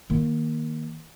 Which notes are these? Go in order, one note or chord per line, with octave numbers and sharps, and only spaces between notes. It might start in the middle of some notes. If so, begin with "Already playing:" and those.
D#3 A#3